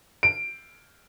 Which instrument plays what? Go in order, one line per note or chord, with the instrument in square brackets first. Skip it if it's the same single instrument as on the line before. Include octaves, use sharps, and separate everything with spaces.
[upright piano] D7